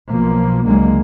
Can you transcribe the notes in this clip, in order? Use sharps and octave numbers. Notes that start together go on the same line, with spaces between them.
B1 B2 F3 A#3
C#2 D3 F#3 G#3 A#3